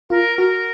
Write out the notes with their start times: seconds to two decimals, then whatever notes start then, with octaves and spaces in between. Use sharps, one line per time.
0.10 F4 A#4
0.38 F#4 A#4